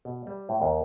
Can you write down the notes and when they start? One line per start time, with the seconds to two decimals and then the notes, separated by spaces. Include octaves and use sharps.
0.05 B2
0.27 G3
0.49 A2
0.62 D#2